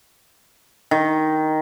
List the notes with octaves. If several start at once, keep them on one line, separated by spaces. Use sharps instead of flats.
D#3